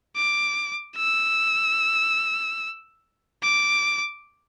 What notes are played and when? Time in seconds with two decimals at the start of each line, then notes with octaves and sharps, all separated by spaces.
0.16 D6
0.97 E6
3.43 D6